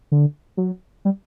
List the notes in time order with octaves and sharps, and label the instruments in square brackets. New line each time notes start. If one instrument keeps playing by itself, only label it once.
[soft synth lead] D3
F#3
G3